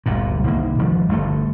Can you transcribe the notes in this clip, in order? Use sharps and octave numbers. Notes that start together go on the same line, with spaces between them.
G1 D2 A#2
C2 D#3 A#3
G#1 D#3 F3 G3
G1 G2 A3